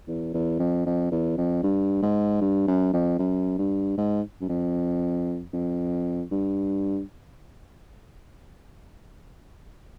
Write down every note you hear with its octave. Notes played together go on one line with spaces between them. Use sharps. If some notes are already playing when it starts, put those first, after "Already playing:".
E2
E2
F2
F2
E2
F2
G2
G#2
G2
F#2
F2
F#2
G2
G#2
F#2
F2
F2
G2